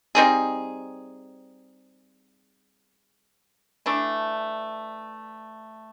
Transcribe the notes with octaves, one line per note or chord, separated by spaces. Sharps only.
G3 C4 D#4 G#4
E3 A3 D4